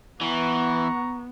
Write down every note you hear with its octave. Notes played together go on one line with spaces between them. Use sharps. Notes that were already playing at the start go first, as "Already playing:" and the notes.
E3 B3 F#5 A#5 C#6